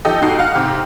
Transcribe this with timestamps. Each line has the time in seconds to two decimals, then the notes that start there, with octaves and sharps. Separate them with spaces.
0.05 F3 D#4 G4 A4 D#5
0.22 G#2 D#4 F#4 C7
0.39 F5 F#5 F6
0.55 G#2 C3 G4